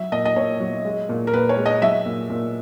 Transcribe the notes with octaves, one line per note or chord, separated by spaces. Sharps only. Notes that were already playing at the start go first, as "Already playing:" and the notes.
Already playing: F#3 E5
A#2 D#5
D#5
A#2 C#5
F#3
G#3
A#2
A#4
A#2 B4
C#5
G#3
D#5
F#3 E5
A#2
A#2